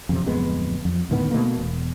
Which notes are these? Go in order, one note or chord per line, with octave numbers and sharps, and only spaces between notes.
F2 C3
D1 F2 G#3 B3
F2
D2 A2 D#3 B3
B2 A3 A#3
E1